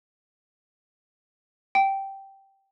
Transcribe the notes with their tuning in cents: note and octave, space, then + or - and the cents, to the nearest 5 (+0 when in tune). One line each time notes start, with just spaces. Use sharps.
G5 -10